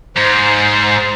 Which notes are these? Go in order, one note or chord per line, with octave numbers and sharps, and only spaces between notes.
G#2 C5